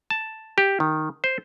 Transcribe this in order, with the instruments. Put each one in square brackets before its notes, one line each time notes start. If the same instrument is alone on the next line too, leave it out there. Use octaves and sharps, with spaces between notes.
[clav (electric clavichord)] A5
G4
D#3
C5